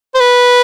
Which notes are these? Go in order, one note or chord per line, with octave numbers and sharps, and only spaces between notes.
C5
B4